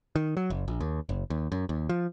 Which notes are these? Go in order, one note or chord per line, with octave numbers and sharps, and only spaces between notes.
D#3
F#3
F#1
A#1
D#2
F#1
D#2
F#2
D#2
F3